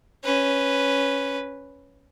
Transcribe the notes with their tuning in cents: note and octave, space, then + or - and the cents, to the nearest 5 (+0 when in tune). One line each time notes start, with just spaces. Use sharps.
C#4 +0 B4 +0